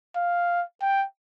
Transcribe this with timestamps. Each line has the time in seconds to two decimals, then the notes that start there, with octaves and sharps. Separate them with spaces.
0.16 F5
0.82 G5